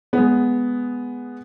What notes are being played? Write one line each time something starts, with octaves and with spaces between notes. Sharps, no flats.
G#3 B3